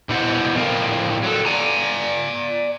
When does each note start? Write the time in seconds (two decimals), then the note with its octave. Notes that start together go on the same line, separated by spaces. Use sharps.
0.09 B2 E4 C5 F#5
0.55 A2 F3 C4 F4 A#4 F5
1.23 F#3 A4
1.45 D5 G#5 A#5